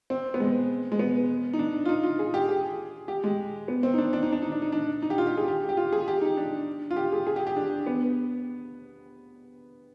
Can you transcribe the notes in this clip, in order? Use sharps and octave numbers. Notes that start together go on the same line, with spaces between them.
C4
B3
G#3
G#3
B3
D#4
D4
F4
D#4
F4
G#4
G4
G#4
G4
G#3
B3
C4
D#4
D4
D4
D#4
D4
D#4
D4
D#4
D4
D#4
G4
F4
G4
G#4
G4
G4
F4
G#4
G4
D#4
D4
F4
G4
G#4
G#4
G4
G4
D4
B3